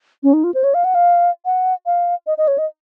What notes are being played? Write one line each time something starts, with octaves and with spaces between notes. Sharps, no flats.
C#4
D#4
F4
C5
C#5
F5
F#5
F5
F#5
F5
D#5
D#5
C#5
D#5